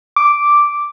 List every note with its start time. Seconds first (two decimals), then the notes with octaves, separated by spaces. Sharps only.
0.16 D6